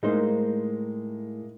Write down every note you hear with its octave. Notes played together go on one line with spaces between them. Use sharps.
A2 G#3 A#3 D#4 C5